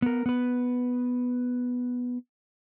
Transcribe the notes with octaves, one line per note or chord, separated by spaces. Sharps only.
B3 A#4
B3 B4